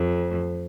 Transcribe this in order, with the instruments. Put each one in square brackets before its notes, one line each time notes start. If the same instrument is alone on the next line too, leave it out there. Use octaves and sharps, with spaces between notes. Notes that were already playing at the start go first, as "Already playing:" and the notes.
Already playing: [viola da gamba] F2